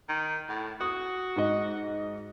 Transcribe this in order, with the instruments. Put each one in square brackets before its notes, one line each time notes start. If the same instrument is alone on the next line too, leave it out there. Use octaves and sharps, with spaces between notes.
[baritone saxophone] D#3
A2
[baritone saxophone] F#4 [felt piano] D#6
[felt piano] G#2 D#5